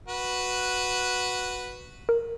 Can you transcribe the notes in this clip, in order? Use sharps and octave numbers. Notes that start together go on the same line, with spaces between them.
F#4 B4
A#4